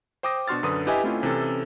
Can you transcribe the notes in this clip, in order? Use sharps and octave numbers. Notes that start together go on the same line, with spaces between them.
C5 G5 D6 D#6 A#6
B2 D4 F#4 C6 F6 A6
F#2 D3 B4 D#6
E4 G4 B4 D#5 E5 G#5
A3 C4 C#4 E4 F4
C3 E3 C#4 A4